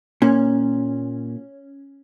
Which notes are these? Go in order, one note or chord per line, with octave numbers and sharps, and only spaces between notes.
A#2 C#4